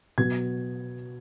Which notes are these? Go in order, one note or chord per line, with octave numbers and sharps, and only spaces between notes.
B2 F#3 B3 G#6